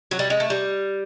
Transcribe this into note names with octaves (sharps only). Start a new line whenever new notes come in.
F#3
G3
G#3
A3
G3